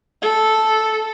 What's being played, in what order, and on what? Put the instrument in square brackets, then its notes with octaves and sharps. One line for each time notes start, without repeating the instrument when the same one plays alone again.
[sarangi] A4